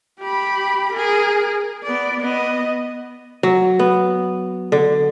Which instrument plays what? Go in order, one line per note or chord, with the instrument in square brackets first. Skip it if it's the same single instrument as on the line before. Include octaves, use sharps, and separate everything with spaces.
[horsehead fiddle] G4 B5
G#4 A#4
B3 D5
B3 D#5
[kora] F#3
B3
D3